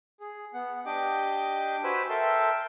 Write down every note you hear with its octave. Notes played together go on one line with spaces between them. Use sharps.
G#4
B3 F#5
D4 G4 D#5 G5 D6
F#4 B4 C5 G#5 B5 E6
A4 A#4 E5 G5 A5 C6